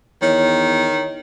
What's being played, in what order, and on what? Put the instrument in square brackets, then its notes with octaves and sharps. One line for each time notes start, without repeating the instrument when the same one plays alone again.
[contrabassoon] E2 [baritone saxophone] D#3 [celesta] C#5